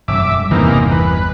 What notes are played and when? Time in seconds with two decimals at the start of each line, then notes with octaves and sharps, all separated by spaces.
0.08 E1 F#2 G3 E5 D6
0.51 G1 E2 C3 E3 A#3 D#4
0.92 B4